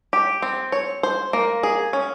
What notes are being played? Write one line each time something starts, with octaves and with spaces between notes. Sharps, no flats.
G4
C4
C#5
C5
A#3
G#4
C#4